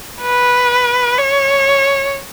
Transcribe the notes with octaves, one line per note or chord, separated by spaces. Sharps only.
B4
C#5